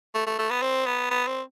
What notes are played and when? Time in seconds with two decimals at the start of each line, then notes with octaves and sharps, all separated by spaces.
0.14 A3
0.27 A3
0.39 A3
0.50 B3
0.62 C4
0.86 B3
1.10 B3
1.27 C4